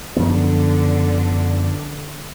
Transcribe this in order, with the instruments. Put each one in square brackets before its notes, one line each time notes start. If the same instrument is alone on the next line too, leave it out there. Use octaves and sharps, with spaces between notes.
[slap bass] F#2 F3 B3 [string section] D3 D4